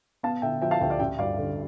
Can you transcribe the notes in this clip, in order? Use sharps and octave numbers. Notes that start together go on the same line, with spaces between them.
B3 F5 A5
D3 E5 G5
F3 E5 G5
F5 A5
D2 E5 G5
D5 F5
A1 E5 G5
G2 D5 F5
D3